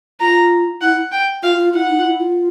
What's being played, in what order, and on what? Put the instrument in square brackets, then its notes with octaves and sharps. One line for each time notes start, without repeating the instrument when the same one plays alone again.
[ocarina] F4 [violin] A#5
[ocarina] E4 [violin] F#5
[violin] G5
[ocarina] F4 [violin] F5
[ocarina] F4
[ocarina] E4 [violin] F#5
[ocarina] D#4
F4
E4
F4